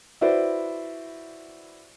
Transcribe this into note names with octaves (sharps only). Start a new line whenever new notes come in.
E4 F#4 B4 C5 D5 E5